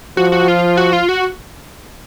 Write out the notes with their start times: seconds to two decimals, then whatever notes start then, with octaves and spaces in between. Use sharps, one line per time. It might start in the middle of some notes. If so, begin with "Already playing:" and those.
0.17 F3 F#4
0.32 F#4
0.48 F4
0.77 F#4
0.93 F4
1.09 F#4